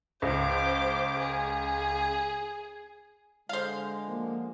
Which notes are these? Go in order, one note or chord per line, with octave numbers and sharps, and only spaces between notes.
C#2 C5 D6
G#4
D3 G#3 C5 F5
F3 A#3